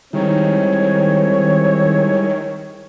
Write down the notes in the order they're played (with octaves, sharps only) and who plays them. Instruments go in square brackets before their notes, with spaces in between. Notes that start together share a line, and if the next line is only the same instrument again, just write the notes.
[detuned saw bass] D#3 [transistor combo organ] G3 G#3 E4 [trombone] C4 [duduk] C#5